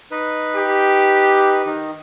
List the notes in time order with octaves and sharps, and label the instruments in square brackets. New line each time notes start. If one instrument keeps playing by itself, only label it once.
[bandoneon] D#4 B4
[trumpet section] G4
[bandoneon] D#3 D#4